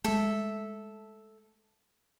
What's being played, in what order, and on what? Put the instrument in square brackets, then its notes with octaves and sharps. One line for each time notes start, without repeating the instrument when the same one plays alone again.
[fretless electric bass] G#3 A3 [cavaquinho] A4 E5